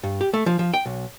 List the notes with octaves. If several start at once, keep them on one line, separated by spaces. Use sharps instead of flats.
G2
G4
A3
F3
F3
G5
B1